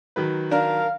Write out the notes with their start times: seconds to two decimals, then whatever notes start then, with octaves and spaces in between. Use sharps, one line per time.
0.16 D#3 F#3 B4
0.51 D4 A#4 F5